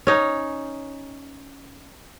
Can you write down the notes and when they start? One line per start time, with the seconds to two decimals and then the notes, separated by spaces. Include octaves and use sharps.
0.07 C#4 D#4